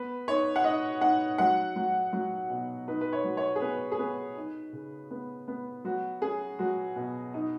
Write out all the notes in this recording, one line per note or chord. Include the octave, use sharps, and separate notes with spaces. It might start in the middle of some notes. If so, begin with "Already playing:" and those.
Already playing: B3 B4
D#4 C#5
F#5
D#4 D#5
D#4 F#5
F#3 F#5
F#3
F#3
B2
D#4 B4
B4
C#5
F#3
C#5
G#4
B3 B4
G#4
B3 B4
D#4
C#3
B3
B3
F#3 F#4
C#4 G#4
F#3 F#4
B2
D#4